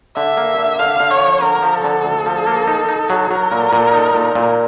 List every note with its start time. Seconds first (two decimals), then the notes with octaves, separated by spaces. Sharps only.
0.16 D3 E5
0.37 A#3
0.58 D3
0.79 D3 F5
1.00 D3
1.11 C#5
1.21 F3
1.41 D3 A#4
1.63 F3
1.73 A4
1.84 D3
2.05 D2
2.26 F3
2.47 A#3
2.67 D#4
2.89 D#4
3.10 F#3
3.31 F#3 A#4
3.52 A#2
3.73 A#2
3.93 D#4
4.14 A#2
4.35 A#2